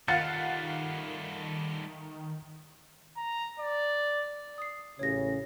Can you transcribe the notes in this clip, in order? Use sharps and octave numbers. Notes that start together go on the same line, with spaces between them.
D#3 G3 A3 F4 F5 F#5 A6 C#7
A#5
D5
D#6 C7
A1 C#3 C#5 A#6